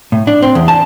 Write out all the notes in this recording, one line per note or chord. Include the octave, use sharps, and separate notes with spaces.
A2
D4
C4
E2
A5